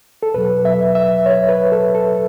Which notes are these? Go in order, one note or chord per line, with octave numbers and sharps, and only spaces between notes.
A4
E2 B2 F#3 B4
E5
E5
C#5
B4
A4
A4